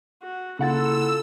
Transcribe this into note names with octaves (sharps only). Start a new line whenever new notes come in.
F#4
C#3 A#3 E4 F4 A4 F#5 E6 A6